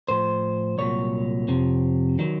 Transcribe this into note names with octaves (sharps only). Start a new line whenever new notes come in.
A2 F3 C5
C2 A#2 F#3 C#5
F2 C3 F3
D#3 F#3